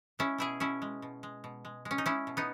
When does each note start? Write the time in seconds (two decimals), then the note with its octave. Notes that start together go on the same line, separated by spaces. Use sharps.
0.19 G#3 C#4 E4
0.38 B2 E4 G#4
0.60 B2 C#4 E4
0.82 G#3
1.02 B2
1.23 G#3
1.44 B2
1.65 G#3
1.85 G#3
1.91 C#4
1.98 D#4
2.06 G#3 C#4 E4
2.27 B2
2.37 B3 D#4